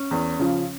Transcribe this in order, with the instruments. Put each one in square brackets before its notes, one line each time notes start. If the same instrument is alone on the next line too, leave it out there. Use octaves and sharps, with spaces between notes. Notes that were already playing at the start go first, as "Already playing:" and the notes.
Already playing: [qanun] C#4
[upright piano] E2
C#3 F3